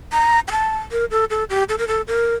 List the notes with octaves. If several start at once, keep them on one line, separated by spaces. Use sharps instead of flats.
A#5
G5
A5
A#4
A4
A4
G4
A4
A#4
A4
A#4